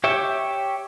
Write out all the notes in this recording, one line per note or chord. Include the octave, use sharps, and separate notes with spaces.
G4 C#5 E5 G5